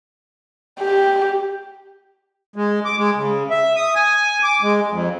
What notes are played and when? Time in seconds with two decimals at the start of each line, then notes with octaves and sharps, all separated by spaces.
0.80 G4
2.56 G#3
2.85 D6
2.98 G#3
3.16 C#3
3.50 E5
3.76 D#6
3.95 G#5
4.43 D6
4.63 G#3
4.90 F2